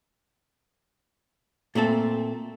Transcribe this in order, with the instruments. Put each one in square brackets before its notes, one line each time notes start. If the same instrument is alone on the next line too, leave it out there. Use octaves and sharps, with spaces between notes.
[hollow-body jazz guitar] A#2 A3 C4 A4